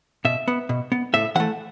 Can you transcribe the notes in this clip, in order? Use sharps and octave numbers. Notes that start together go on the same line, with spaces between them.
B2 E5
B3
B2
B3
A2 E5
E3 A3 F#5